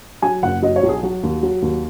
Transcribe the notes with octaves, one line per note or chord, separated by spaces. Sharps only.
F#3 G#5
F#1 F#5
F#3 D#5
C#5
B1
G#4
F#3 F#4
D#2
F#3
D#2